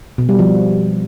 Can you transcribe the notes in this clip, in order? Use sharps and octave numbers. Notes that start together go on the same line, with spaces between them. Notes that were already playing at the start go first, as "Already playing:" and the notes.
B2
G3
F3